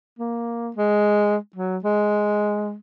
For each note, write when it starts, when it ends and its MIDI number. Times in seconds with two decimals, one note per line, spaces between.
0.19 0.71 58
0.76 1.37 56
1.56 1.78 54
1.84 2.75 56